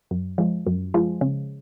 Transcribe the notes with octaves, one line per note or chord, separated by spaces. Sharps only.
F#2
F3 G#3
F#2
F3 G#3
C#3